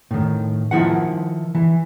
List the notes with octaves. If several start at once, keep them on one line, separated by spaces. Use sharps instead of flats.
A2 D#3
D#3 F3 E4 F#5
E3